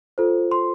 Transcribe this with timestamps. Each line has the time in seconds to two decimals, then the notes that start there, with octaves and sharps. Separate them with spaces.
0.18 F4 A4 C5
0.51 C6